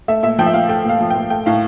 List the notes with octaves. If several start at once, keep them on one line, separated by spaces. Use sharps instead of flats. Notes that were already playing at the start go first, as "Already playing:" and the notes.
A3 E5
A#2 E5
F3 G5
E5
A#2 F5
A3 G5
A#2 F5
F3
A#2 G5
A3 G5
A2 F5